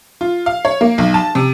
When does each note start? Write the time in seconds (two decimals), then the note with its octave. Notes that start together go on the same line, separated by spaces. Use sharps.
0.21 F4
0.46 F5
0.65 C#5
0.81 A#3
0.98 B1
1.14 A5
1.35 C3